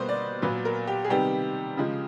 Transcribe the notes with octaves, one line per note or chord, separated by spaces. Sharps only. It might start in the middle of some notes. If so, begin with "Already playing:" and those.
Already playing: B2 G3 A#3 B4 C5
D5
A#2 F#3 B3 B4
A#4
G4
G#4
C3 D#3 G3 B3 G4
C#3 F3 G#3